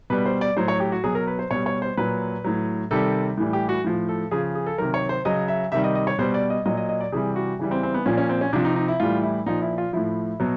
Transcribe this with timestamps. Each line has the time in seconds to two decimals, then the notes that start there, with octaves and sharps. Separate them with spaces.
0.10 B2 G3 B4
0.26 C5
0.41 D5
0.57 A2 F#3 C5
0.68 C#5
0.80 G4
0.92 F#4
1.04 B2 F#3 G#4
1.15 A#4
1.27 B4
1.39 C5
1.51 B2 G3 C#5
1.66 C#5
1.82 C5
1.97 A#2 F#3 B4
2.45 A2 F#3
2.91 C3 D#3 G3 A4
3.37 A2 E3 G3
3.53 G4
3.69 F#4
3.84 A2 F3
4.08 A4
4.31 C#3 F3 G#4
4.55 G#4
4.66 A4
4.78 C3 D#3 F#3 A#4
4.94 C#5
5.09 C5
5.25 C#3 F#3 D#5
5.48 E5
5.72 C3 D#3 G3 E5
5.84 D#5
5.95 D#5
6.07 C#5
6.18 B2 G3 C5
6.34 D5
6.50 D#5
6.66 A#2 F#3 D#5
6.77 D#5
6.89 D#5
7.00 D5
7.12 C3 E3 G3 G#4
7.36 F#4
7.59 C#3 E3 G3
7.71 C4
7.83 C4
7.94 B3
8.06 A#2 F3 C#4
8.18 C#4
8.29 C4
8.41 C#4
8.53 C3 F3 D4
8.65 D#4
8.76 D#4
8.88 E4
9.00 A2 E3 G3 F4
9.23 E4
9.46 A#2 F3 D#4
9.62 E4
9.78 F4
9.93 A2 F3 E4
10.40 B2 F#3